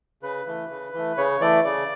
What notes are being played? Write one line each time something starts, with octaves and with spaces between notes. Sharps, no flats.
C#3 B4
E3 A3
C#3
E3 A3
C#3 C#5
E3 A3 D5
C#3 D5